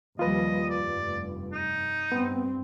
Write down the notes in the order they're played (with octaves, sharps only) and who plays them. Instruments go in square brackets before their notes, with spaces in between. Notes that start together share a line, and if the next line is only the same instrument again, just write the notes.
[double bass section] D#2 F3 G3 [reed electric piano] F4 B4 [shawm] D#5
[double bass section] F1 G2 [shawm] D5
[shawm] D#4
[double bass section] G2 C4 [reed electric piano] B3